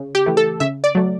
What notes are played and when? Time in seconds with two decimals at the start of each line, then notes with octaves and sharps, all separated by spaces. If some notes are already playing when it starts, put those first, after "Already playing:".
Already playing: C#3
0.15 G4
0.26 E3 A3
0.37 A4
0.60 C#3 E5
0.84 D5
0.95 F#3 A3